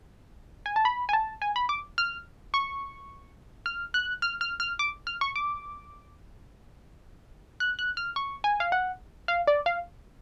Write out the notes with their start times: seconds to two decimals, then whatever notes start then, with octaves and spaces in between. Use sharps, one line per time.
0.66 G#5
0.76 A5
0.85 B5
1.09 G#5
1.13 A5
1.42 G#5
1.56 B5
1.69 D6
1.98 F6
2.54 C#6
3.66 F6
3.94 F#6
4.22 F6
4.41 F6
4.60 F6
4.79 D6
5.07 F6
5.21 C#6
5.36 D6
7.60 F#6
7.79 F#6
7.97 F6
8.16 C#6
8.44 G#5
8.60 F5
8.72 F#5
9.28 F5
9.47 D5
9.66 F5